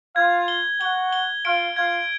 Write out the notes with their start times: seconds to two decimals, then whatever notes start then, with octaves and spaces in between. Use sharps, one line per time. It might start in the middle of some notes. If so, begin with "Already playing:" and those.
0.15 F4 F5 G#6
0.48 G7
0.80 F#4 F#5 G7
1.13 G7
1.44 F4 F5 D7
1.76 F4 F5 G#6